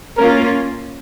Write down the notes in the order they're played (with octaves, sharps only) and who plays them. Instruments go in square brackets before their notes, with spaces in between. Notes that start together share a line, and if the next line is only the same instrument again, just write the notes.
[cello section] A#3 C#4 F4 [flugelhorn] A#4